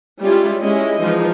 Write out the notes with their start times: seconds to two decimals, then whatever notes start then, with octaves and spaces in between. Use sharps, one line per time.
0.20 G3 G#3 C#4 E4 F4
0.60 G#3 C#4 E4 D#5
1.00 E3 F3 G#3 D#4